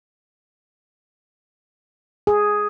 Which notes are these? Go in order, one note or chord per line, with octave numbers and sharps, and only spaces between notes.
G#4